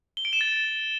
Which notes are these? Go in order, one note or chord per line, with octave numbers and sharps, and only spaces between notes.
G7
D7
E7
A6